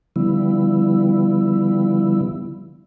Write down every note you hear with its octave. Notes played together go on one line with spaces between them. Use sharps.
D3 F3 G3 B3 E4